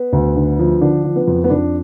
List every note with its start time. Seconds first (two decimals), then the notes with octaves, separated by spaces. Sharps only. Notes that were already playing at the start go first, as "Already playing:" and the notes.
Already playing: B3
0.13 D2
0.36 D3
0.59 F3
0.81 D3 D4
1.04 F3
1.16 B3
1.28 F2
1.44 B3
1.50 F2 D4